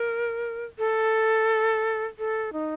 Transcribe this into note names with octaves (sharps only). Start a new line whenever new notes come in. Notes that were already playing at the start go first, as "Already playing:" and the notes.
Already playing: A#4
A4
A4
D#4